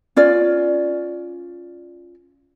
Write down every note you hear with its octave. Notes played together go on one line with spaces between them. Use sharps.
C#4 F4 D5